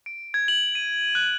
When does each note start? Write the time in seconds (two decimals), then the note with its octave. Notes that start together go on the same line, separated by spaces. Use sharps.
0.06 D7
0.34 G#6
0.48 F#7
0.75 D#7
1.15 F#6